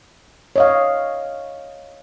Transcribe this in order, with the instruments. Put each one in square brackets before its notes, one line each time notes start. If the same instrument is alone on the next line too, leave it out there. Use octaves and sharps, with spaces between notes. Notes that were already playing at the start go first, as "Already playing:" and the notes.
[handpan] C#5 D#5 F5